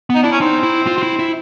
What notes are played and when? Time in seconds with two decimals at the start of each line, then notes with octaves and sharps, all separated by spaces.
0.10 B3 D#4
0.23 D4 E4
0.32 C#4
0.40 C4 D#4
0.63 E4
0.87 F4
0.98 F4
1.03 E4
1.19 E4